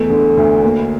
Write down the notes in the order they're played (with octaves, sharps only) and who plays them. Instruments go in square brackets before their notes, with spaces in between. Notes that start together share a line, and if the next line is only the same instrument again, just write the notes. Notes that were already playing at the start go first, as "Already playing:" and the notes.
Already playing: [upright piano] E2 A3
D3
D2
A#3